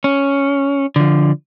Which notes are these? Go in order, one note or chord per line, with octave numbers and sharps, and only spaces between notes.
C#4
D3 F3